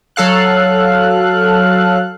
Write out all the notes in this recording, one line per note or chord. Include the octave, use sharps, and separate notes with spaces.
F#3 A4 F5 F#6